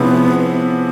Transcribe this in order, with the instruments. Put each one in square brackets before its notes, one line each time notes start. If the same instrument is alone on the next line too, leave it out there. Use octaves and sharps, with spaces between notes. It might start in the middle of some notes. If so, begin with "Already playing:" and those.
Already playing: [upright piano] C3 F3 G#3 C#4 E4 [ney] B3
[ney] B3